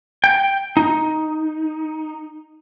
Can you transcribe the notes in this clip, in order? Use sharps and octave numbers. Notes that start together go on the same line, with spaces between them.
G5
D#4